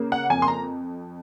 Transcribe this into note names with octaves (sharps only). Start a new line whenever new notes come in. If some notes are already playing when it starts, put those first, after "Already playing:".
Already playing: C#3 A#3
F#5
F2 G#5
C6
A#5